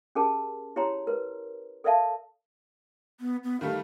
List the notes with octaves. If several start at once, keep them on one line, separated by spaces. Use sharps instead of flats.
C#4 G4 G#4 A#4 A5
E4 G4 C#5 A#5 C6
A#4 B4
A4 A#4 D5 E5 F5 A5
B3
B3
D#3 G3 A3 F5